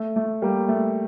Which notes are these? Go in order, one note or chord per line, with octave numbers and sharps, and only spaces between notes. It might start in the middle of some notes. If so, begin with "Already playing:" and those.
Already playing: A3
A3
G3 A#3
A3